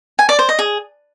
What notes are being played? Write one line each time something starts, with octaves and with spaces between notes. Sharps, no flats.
G#5
D5
C5
D#5
G#4